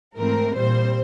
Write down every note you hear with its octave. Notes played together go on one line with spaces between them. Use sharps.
G#2 E3 A3 C4 A#4
A#2 G3 C4 C5